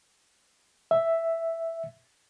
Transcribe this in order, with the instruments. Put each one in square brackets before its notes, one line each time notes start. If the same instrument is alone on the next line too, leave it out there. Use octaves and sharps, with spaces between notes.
[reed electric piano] E5